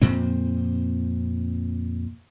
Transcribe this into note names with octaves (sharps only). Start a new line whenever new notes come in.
F2 A#2 C4